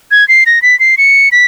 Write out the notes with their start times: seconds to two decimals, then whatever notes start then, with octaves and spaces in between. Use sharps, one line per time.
0.11 G#6
0.28 C7
0.46 A#6
0.62 B6
0.80 C7
0.98 C#7
1.32 B6